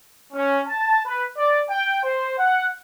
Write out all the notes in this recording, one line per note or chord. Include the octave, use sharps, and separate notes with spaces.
C#4
A5
B4
D5
G5
C5
F#5